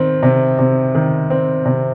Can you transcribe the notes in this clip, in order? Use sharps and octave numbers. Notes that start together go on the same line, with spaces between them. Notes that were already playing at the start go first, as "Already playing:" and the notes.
Already playing: D#3 C4
C3
C3
D#3
C4
C3